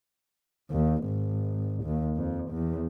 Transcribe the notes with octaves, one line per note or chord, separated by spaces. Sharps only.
D#2
G#1
D#2
F2
E2